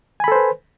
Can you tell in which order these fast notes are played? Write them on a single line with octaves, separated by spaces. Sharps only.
G#5 B5 A4 C5 B4